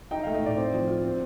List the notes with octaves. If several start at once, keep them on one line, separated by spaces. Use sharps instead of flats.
D#4 G5
A3 F5
D#5
A2 D5
C4
F3
F4
C4